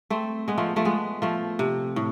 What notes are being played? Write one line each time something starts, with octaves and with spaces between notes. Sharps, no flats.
A3 C4
G#3 B3
F3 A3
F3 A3
G#3 B3
F3 A3
C3
A2